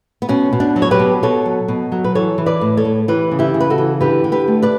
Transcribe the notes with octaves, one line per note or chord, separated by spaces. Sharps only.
B3
B2 C#4
B2
B3 D4
F#3
C#5
G4 B4
B2
B2 A4 C#5
F#3
B2
F#3
B4
E3 A4 C#5
E3
B4 D5
A2
A4 C#5
A2
E3 G4 B4
C#3
E4 G4
C#3
B4
F#4 A4
E3
D3 G4 B4
D3
G4 B4
A3
B4 D5